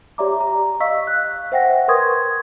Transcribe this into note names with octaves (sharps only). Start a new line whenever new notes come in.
G4 C#5 D5 E5 A#5 D6
A#5
D#5 F5 C#6 E6 B6
F#6
C5 E5 F#5 G5 A#6
A#4 B4 C6 C#6 D#6 G#6